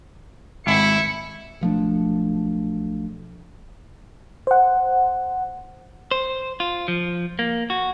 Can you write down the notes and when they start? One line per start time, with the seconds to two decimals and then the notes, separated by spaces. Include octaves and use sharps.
0.67 G#1 E4 C#7
1.61 B1 F3 A3 D4
4.47 C5 F#5
6.11 C5
6.60 F4
6.88 F3
7.39 A#3
7.70 F#4